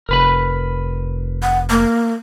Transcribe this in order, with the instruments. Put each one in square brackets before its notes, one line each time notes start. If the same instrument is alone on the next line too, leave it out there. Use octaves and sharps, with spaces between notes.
[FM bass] F1 [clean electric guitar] A#4 B4 B5
[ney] F#5
A#3